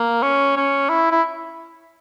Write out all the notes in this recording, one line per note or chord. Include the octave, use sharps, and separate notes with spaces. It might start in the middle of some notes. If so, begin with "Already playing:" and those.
Already playing: A#3
C#4
C#4
E4
E4